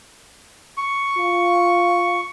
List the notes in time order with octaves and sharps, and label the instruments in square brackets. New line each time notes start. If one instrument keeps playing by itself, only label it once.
[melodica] C#6
[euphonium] F4